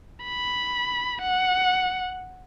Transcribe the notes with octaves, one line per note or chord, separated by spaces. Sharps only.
B5
F#5